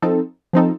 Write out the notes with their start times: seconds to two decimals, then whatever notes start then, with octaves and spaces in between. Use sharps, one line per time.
0.02 F3 C4 D#4 A4
0.53 F3 C4 D#4 A4